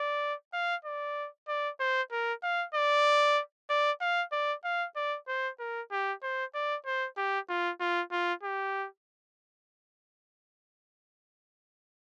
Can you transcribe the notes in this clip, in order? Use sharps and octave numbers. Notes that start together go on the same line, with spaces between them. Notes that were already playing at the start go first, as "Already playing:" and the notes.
Already playing: D5
F5
D5
D5
C5
A#4
F5
D5
D5
F5
D5
F5
D5
C5
A#4
G4
C5
D5
C5
G4
F4
F4
F4
G4